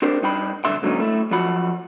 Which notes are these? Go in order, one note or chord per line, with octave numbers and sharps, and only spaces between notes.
C4 D4 G4 A#4 C5
G2 D#4 G5 B5
B1 G2 D3 E5 C6
G#2 D3 F#3 A#3 C#4 D#4
A3 E4
F2 F3 F#3 F#4 B5